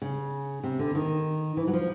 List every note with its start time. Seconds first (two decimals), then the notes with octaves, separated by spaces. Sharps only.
0.02 C#3
0.64 C3
0.79 D3
0.95 D#3
1.57 E3
1.67 F#3
1.73 F3